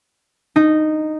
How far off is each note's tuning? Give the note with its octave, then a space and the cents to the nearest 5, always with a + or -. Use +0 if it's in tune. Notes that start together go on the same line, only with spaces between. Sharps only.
D#4 -10